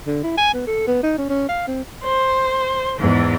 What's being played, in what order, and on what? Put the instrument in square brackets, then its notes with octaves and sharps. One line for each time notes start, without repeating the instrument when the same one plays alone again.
[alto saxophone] D3
E4
G#5
B3
A4
B3
D#4
C#4
C#4
F5
C4
[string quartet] C5
E2 G#2 E3